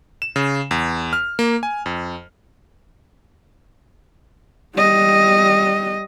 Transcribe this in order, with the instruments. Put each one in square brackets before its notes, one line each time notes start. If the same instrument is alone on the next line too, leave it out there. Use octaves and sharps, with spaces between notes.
[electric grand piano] E7
C#3
E2
F6
A#3
G#5
F2
[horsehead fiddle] G3 D#5